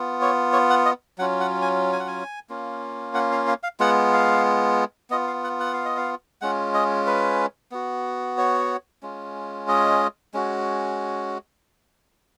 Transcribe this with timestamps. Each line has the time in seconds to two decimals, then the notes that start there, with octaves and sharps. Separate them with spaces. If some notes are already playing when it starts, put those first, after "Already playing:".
Already playing: B3 F4
0.21 C#5
0.53 C#5
0.70 F#5
0.86 D#5
1.18 F#3 C#4 F4 F#5
1.40 F#5
1.62 G#5
1.93 G#5
2.00 F#5
2.07 G#5
2.50 A#3 C#4 F4
3.14 F#5
3.32 F5
3.48 F5
3.63 F5
3.80 G#3 B3 F4 F#5
4.13 F5
5.10 B3 F4 D#5
5.27 F5
5.44 F#5
5.60 F#5
5.73 F5
5.85 D#5
5.97 F5
6.41 G#3 C#4 F4 F#5
6.74 D#5
7.07 B4
7.72 B3 F#4
8.38 C#5
9.03 G#3 C#4 F4
9.68 D#5
10.34 G#3 C#4 F#4